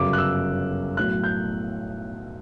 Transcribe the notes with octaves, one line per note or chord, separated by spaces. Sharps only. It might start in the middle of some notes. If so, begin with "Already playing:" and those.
Already playing: G1 F#2 C#3 D6
F#6
E6
B1 A2 F#3 F#6
G6